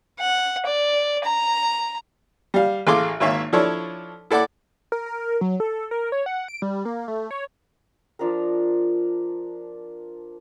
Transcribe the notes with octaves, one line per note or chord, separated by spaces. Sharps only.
F#5
D5
A#5
G3 F5
A1 G#4 A4 F5 C6 D6
G#1 A#3 C#5 E5 F5
F3 D4 E4 A4 C#5
E4 A4 D5 F#5 D6
A#4
A#4
F#3
A4
A#4
C#5
F#5
D7
G3
A#3
A3
C#5
F3 D4 F4 A#4